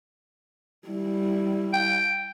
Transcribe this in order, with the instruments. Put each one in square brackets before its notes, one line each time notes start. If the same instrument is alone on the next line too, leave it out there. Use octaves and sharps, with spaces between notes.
[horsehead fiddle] G3 E4
[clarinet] G5